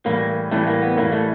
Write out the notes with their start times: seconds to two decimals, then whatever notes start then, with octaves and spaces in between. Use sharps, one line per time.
0.06 A2 E3 G3 A#3
0.51 A2 E3 G3 A3
0.67 A#3
0.82 B3
0.97 A2 E3 G3 A#3
1.12 A3